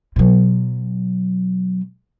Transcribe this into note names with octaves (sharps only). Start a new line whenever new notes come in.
B2 F#3